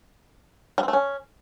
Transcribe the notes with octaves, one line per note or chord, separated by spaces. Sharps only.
G3
C4
A3
C#4